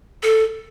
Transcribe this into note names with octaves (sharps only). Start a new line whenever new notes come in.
A4